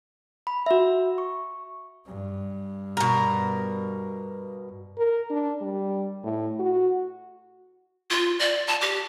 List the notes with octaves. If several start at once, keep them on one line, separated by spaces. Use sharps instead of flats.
B5
F#4 E5
C#6
G2
B2 A#4
A#4
D4
G3
A2
F#4
F4
D5
A5
G4